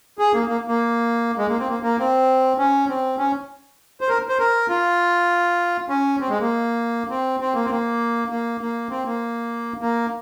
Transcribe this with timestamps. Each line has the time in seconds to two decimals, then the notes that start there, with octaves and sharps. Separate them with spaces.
0.19 G#4
0.33 A#3
0.48 A#3
0.68 A#3
1.38 G#3
1.48 A#3
1.59 C4
1.69 A#3
1.83 A#3
1.99 C4
2.58 C#4
2.88 C4
3.18 C#4
4.01 C5
4.09 A#4
4.29 C5
4.39 A#4
4.69 F4
5.89 C#4
6.20 C4
6.29 G#3
6.40 A#3
7.10 C4
7.40 C4
7.54 A#3
7.65 C4
7.70 A#3
8.30 A#3
8.61 A#3
8.90 C4
9.05 A#3
9.81 A#3